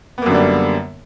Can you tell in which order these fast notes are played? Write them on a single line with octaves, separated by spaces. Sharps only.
B3 A#3 F#2 D3 G3